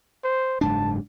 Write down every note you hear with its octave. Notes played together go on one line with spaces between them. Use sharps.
C5
F#1 G#2 D4 A5